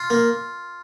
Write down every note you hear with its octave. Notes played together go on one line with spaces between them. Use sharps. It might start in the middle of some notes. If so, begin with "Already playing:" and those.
Already playing: F4
A#3